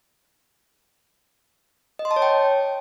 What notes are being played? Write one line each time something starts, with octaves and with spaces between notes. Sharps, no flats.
D#5
C6
A5
C#5
G5